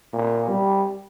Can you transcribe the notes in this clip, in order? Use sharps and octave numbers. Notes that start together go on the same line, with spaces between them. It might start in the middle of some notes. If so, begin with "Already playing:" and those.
A#2
G3